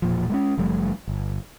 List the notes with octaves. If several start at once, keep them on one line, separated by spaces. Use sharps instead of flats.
E1 A#2 F3
G#3 A3 C#4
F#1 F3 G3 A3
G1